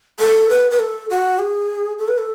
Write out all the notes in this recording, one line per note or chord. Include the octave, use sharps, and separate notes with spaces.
A4
B4
B4
A4
F#4
G#4
A4
B4
A4